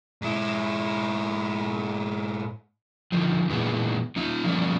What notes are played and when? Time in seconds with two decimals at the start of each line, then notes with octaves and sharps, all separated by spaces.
0.22 G#2 E4
3.12 D3 D#3 F3
3.49 A#2 D#3 E3 G#3 B3
4.16 A#3 D#4 F4
4.44 F3 G3 A#3 B3 C#4